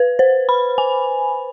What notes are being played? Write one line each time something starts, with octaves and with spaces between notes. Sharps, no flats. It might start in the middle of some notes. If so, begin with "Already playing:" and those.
Already playing: B4
C5
B5
G#5